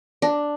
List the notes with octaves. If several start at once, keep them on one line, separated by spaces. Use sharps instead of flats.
D4